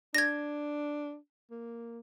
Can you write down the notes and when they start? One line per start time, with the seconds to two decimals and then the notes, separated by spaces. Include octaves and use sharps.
0.15 D4 G#6 A#6
1.51 A#3